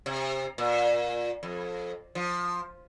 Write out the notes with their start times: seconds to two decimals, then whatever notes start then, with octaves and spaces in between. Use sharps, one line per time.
0.06 C3
0.58 A#2
1.43 F2
2.15 F3